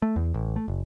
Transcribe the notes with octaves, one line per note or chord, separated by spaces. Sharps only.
A3
E2
A1
A3
F#1